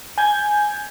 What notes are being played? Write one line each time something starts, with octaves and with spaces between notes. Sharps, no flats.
G#5 G6 G#6